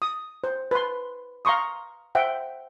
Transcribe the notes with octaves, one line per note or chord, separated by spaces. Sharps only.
D#6
C5
B4 C6
F5 A#5 C6 C#6 D#6
C5 E5 F#5 G5